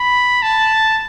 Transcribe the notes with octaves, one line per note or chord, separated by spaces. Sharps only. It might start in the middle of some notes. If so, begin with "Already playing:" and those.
Already playing: B5
A5